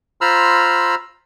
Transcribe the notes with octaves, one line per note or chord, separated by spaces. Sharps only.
F4 C5 A#5 B5 E6 F6